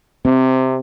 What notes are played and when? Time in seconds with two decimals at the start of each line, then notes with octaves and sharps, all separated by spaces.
0.25 C3 C4